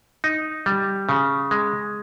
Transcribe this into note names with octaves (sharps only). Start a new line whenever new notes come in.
D#4
G3
C#3
G#3